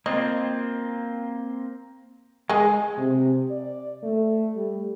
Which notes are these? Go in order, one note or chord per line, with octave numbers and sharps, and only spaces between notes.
A#3 C4 F4 D#5
G#3 G#4 D#5 G#5
C3
D5
A3
G3